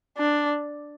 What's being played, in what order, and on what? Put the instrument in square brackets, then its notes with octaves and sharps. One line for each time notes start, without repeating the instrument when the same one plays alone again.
[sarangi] D4